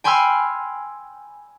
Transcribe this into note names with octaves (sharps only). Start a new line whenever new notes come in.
G5 G#5 B5 C6 E6 F6